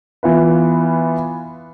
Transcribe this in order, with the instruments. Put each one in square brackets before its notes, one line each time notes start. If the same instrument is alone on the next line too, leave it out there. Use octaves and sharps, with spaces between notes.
[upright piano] E3 B3 F4 B4